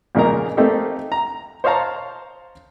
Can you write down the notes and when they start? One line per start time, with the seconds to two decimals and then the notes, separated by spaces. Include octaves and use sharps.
0.15 F2 A#2 C#3 D#4 A#4 A#5
0.57 A3 A#3 C4 D#4 G4 A4
1.12 A#5
1.64 C5 C#5 D#5 F5 A5 A#5